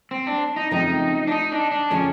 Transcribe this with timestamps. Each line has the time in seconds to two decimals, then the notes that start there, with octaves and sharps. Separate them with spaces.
0.11 C4
0.27 D4
0.56 D#4
0.71 C#3 F3 A3 C4 D#4
1.27 D4
1.32 D#4
1.52 D4
1.72 D4
1.90 C#3 F3 A3 C#4